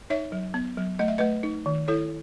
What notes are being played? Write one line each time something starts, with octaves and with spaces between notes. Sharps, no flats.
D#4 C#5 E5
F#3
B3
F#3
A3 D#5
E5
A3 B4 D#5
D#4
D#3
E4 A4 C#5